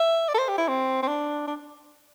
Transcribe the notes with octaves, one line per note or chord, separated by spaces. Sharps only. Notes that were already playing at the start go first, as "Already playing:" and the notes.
Already playing: E5
D5
A4
C5
G4
E4
C4
C4
D4
D4